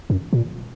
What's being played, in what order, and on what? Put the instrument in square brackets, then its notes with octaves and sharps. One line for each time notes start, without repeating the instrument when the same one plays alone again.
[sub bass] F#2
A#2